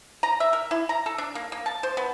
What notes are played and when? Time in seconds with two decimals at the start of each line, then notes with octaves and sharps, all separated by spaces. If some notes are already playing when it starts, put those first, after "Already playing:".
0.23 A#5
0.40 E5
0.53 A#4
0.71 E4
0.89 A#5
1.06 A4
1.18 D4
1.35 A#3
1.52 A#3
1.66 A5
1.83 C5
1.97 B3